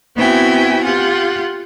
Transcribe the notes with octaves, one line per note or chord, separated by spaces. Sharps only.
B3 C4 E4 F#4 G5 G#5
F4 G4 F#5